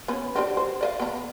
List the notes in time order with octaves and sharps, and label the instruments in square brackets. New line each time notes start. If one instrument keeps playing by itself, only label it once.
[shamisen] B3 C#4
C4 D4 G4
C5
D5 D#5 F5
B3 A#5